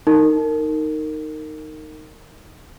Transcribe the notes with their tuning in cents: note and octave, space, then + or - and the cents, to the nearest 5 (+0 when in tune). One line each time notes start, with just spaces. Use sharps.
D#4 +0 A#4 -25